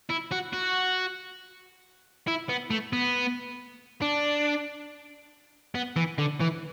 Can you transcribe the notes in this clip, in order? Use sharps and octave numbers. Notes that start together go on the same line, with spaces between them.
E4
F#4
F#4
E4
B3
A3
B3
D4
B3
E3
D3
E3